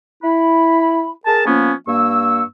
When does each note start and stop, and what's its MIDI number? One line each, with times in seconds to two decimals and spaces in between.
0.23 1.09 64
0.23 1.09 83
1.26 1.46 68
1.26 1.46 70
1.26 1.46 81
1.46 1.72 53
1.46 1.72 58
1.46 1.72 59
1.46 1.72 61
1.88 2.42 43
1.88 2.42 58
1.88 2.42 85
1.88 2.42 88